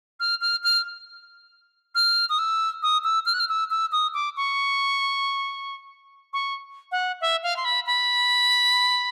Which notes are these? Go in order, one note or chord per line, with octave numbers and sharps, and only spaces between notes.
F6
F6
F6
F6
D#6
E6
D#6
E6
F6
F#6
F6
E6
E6
D#6
D6
C#6
C#6
F#5
E5
F5
C6
B5
B5